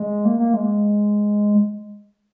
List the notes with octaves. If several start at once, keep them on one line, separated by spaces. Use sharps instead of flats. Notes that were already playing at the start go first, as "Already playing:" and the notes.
Already playing: G#3
A#3
A#3
G#3